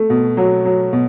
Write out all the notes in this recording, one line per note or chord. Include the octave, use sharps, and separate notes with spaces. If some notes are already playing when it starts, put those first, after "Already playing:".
Already playing: A3
B2
F#3
F#3
B2